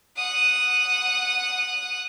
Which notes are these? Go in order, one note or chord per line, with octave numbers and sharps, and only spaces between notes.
F#5 D#6